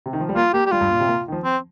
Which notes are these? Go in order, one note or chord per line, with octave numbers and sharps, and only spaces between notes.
C3
D#3
F3
G3
A#3 F4
A#3 G4
G4
G3 F4
G2
A#2
C3
A#3
D#3
F3
C4